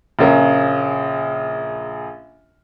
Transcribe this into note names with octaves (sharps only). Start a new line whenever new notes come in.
A#1 C#3 A#4